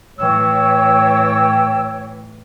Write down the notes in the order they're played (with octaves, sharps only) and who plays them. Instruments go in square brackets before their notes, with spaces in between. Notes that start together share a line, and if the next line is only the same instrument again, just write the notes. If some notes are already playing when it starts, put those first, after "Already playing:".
[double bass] A2 E3 [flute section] C#5 G5 [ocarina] E6